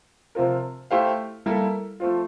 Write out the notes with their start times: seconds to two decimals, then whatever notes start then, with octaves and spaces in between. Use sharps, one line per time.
0.35 C3 F3 C4 F4 A#4
0.91 A3 E4 G4 C5 F5
1.46 G3 A#3 E4 A4
2.00 F3 A3 C4 F4